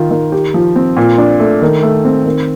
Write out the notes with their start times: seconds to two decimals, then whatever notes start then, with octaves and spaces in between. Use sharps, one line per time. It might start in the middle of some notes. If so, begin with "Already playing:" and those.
Already playing: D#3 F4
0.11 D#3
0.32 G4
0.54 F3
0.76 C4
0.97 A#2
1.18 D4
1.40 A3
1.62 D#3
1.83 A3
2.05 C4
2.26 D#3